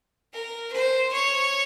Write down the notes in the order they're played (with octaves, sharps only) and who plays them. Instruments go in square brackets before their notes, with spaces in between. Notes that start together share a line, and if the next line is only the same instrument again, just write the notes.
[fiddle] A#4
C5
C#5